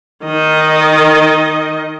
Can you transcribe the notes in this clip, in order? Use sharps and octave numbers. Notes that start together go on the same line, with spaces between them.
D#3 D#5